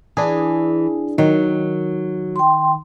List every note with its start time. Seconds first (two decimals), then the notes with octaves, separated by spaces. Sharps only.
0.17 E3 D4 G#4
1.18 D#3 F#3
2.36 G5 C6